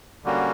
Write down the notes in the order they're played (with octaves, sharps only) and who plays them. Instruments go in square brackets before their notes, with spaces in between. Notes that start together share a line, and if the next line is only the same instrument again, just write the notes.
[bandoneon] D3 G3 A#3 C#4 F#4